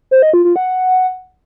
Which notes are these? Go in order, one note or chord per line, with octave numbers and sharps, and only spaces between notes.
C5
D#5
F4
F4
F#5